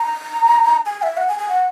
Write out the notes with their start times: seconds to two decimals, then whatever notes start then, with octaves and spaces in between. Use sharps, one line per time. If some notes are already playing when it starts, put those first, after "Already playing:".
Already playing: A#5
0.86 G#5
1.03 E5
1.17 F#5
1.29 G#5
1.39 G#5
1.49 F#5